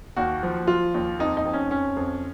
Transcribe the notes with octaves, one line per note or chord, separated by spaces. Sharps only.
D#2 F#4
F3
F3 F4
D#2
F2 D#4
D#4
F2
C#4
F2 C#4
F2